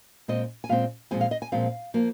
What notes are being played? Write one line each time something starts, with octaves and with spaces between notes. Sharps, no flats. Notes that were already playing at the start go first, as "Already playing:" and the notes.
A#2 G#3 C4 D#5
G#5
A#2 G#3 C4 F5
A#2 F3 G#3 C4 G#5
F5
D#5
G#5
A#2 F3 G#3 C4 F5
F3 A#3